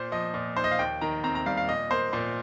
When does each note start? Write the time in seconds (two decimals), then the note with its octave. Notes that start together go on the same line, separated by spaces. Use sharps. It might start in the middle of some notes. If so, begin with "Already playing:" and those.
Already playing: A#2 C5
0.12 F3 D#5
0.34 A#2
0.57 D#4 C5
0.64 D#5
0.71 F5
0.79 D#2 G5
1.01 D#3 A#5
1.24 C4 A#5
1.35 A#5
1.46 G3 F5
1.57 F5
1.68 A#2 D#5
1.91 A#3 C5
2.13 A#2 C5